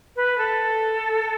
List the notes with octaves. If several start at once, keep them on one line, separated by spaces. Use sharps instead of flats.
B4
A4